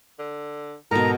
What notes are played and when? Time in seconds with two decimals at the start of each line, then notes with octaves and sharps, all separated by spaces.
0.19 D3
0.91 G#2 B2 D#3 A4 A#4 A#5